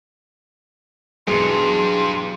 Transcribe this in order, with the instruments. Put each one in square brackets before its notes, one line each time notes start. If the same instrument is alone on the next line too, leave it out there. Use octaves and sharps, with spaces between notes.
[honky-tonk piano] B1 E2 F7 [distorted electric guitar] G2 [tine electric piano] G#4 [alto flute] C6